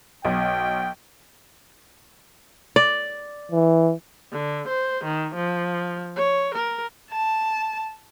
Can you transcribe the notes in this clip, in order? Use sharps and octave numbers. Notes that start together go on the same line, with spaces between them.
B1 G5
D5
E3
D3
C5
D#3
F3
C#5
A#4
A5